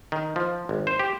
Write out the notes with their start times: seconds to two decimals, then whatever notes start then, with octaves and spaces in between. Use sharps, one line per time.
0.12 D#3
0.36 F3
0.69 G#1
0.87 C5
0.99 G4